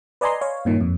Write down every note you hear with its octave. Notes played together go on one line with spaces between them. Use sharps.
B4 D5 D#5 G#5 A#5 C6
C#5 F5
G2 A#2 D#3
F2